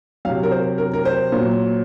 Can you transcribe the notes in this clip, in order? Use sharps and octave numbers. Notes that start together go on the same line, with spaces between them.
C3 F#3 F5
A#4
C5
A#4
A#4
C5
A#2 F#3